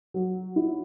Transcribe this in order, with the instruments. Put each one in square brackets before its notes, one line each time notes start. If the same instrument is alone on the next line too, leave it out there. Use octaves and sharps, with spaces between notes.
[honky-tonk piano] F#3
E4